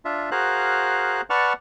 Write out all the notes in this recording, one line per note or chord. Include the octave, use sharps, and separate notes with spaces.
D4 F4 E5
F#4 G#4 A#4 C5 F5 F#6
B4 D5 F#5 A5 C#6 F6